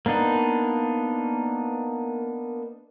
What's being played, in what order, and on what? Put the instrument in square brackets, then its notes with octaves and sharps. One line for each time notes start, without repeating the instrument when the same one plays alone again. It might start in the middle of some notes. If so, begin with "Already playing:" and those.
[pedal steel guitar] A#3 B3 D4 D#4